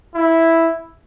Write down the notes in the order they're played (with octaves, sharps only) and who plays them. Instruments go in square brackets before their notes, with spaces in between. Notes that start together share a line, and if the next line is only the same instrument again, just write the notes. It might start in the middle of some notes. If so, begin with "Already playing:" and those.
[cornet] E4